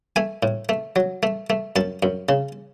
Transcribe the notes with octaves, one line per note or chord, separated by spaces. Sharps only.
A3 G#5
A2
A3
F#3
A3
A3
F#2 A5
F#2
C#3